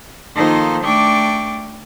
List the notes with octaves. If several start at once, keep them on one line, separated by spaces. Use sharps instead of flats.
D#3 F3 A#3 D#4 A4 C5
A3 D4 G5 C#6 D6